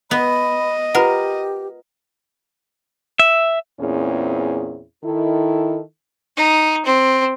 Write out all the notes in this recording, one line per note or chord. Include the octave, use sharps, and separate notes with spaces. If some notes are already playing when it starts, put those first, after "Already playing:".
B3 D#5 B5
F4 G4 A#4 B4 F#5
E5
E2 A#2 C4 C#4 E4 G#4
D#3 E4 A4
D#4
C4